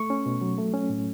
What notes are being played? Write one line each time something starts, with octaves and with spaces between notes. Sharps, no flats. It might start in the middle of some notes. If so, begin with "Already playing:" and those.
Already playing: A3 C#6
C#4
B2
F#3
A3
C#4
A2